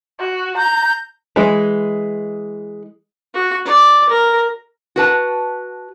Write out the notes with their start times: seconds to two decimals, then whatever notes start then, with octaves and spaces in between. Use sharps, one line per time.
0.19 F#4
0.57 A#5 G6
1.36 E3 G#3
3.34 F#4
3.65 D5
4.09 A#4
4.96 F#4 B4 A5